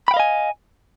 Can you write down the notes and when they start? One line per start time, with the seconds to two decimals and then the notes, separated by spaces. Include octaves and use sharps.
0.08 B5
0.11 G5
0.14 F5
0.17 D#5
0.20 G#5